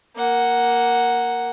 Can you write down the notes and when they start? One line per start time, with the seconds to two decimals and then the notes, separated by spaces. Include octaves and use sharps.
0.16 A#3 F#5